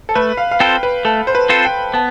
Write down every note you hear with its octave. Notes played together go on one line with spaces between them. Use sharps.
A4
A3 B4
F5
F5
C4 F4 A4 C5 G5
B4
A3 A4
C5
B4
C4 F4 A4 C5
G5
B3 A5